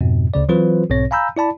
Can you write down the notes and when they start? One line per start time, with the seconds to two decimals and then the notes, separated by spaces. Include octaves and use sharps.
0.01 F2 G#2 B2
0.34 D2 C#3 D5
0.49 E3 F#3 C4 F4 B4 C5
0.90 B1 G#2 B2 C4 C#5 A#6
1.11 F5 G#5 A#5 B5 E6 G6
1.37 E4 D5 A5 B5